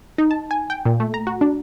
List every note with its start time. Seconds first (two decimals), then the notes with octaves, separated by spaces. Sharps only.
0.18 D#4
0.31 A5
0.51 G#5
0.70 G5
0.85 A#2
1.00 A3
1.14 A#5
1.27 F#4
1.41 D4